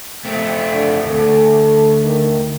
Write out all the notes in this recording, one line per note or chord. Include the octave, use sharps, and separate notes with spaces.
A3 C4
D3
D2 A4
D#3